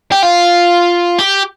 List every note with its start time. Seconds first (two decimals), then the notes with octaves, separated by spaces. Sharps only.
0.12 G4
0.23 F4
1.18 G4